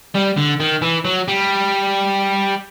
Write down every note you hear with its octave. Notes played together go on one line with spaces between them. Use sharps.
G3
D3
D#3
E3
F#3
G3